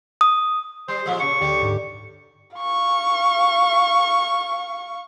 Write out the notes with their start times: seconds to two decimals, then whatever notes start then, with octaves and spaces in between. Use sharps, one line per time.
0.21 D#6
0.88 G3 C5
1.06 A#2 F3 G#3
1.20 A#2 C#3 C#6
1.41 D2 G4 D5
1.61 G#2
2.57 F5 C#6